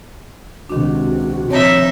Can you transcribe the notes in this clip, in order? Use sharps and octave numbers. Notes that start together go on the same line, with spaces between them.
C#2 C3 D#3 D4 F#4
C3 F3 C4 D#4 C#5 E5